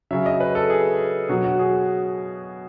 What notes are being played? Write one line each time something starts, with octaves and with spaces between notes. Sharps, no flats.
C#3 F#3 E5
D#5
B4
A4
G#4
B2 F#3 F#4
F#4
G#4